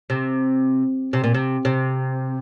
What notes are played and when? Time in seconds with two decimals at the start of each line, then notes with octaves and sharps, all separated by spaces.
0.10 C3
1.13 C3
1.24 A#2
1.35 C3
1.65 C3